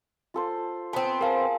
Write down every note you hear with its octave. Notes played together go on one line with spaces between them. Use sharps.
F4 A4 C5
B3 C4 A5 D#6
G#4 A#4 F5 A5